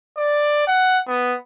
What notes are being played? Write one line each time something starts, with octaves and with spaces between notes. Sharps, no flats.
D5
F#5
B3